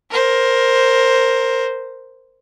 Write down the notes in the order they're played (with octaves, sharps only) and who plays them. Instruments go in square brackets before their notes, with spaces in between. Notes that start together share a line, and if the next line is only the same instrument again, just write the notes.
[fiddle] A#4 C5